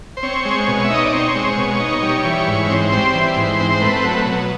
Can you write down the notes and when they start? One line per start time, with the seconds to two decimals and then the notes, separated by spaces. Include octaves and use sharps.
0.17 C5
0.23 C4 C#5
0.45 G#3
0.68 B2
0.84 E5
0.90 D#4 D#5
1.03 D5
1.12 C4 C#5
1.35 G#3
1.57 B2
1.80 D#4
2.03 G3
2.25 E3
2.47 G#2
2.70 C4
2.92 G3 C5
3.14 E3
3.37 G#2
3.60 C4
3.71 C5
3.81 A3 B4
4.04 F#3
4.26 B2